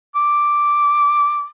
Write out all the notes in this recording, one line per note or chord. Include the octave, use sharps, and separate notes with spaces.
D6